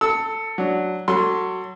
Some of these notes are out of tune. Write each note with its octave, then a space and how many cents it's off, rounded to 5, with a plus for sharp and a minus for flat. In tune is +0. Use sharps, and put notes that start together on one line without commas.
A4 +15 E6 -20
F#3 +0 D4 +0
F#3 +10 A4 +30 C6 +5